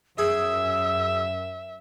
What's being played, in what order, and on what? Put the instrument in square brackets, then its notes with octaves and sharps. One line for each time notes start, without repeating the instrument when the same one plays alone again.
[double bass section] F#2 [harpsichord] G#4 [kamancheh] E5 [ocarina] E6